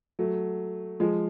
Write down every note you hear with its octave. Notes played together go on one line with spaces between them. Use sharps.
F#3 A3
F3 G#3